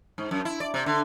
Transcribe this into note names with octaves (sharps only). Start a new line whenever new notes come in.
G#2
F#2
E4
D5
C3
D3